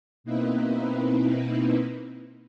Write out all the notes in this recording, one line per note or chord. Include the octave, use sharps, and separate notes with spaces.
B2 A#3 C4 D#4 E4 B4